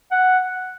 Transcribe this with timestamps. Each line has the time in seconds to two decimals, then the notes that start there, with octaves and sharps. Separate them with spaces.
0.12 F#5